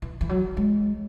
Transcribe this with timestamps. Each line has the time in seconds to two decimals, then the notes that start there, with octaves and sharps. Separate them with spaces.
0.02 E3
0.21 E3
0.29 F#3
0.57 G#3